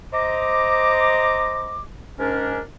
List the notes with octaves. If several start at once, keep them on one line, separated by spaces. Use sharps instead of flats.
C5 D#5 A#5 D6
G#2 C#4 D4 A#4